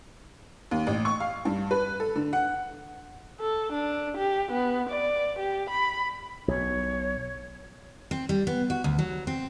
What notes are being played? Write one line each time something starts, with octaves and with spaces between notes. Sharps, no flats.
D#2
A1
C#6
F5
G2
B4
A4
D3
F#5
A4
D4
G4
B3
D5
G4
B5
B1 C#5
C4
G3
B3
F#4
D2
F#3
C4